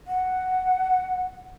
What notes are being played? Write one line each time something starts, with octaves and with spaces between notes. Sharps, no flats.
F#5